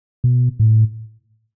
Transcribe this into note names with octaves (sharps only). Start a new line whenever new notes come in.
B2
A2